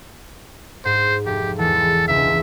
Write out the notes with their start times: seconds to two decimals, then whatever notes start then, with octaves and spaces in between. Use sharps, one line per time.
0.85 G#2 C5
1.26 F1 G4
1.58 E2 E3 G#3 A4
2.08 E1 C#2 E5